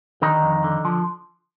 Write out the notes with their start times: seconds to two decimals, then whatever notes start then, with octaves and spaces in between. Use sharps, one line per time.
0.22 D3 D#3 D#4
0.43 F2
0.64 D3
0.85 F3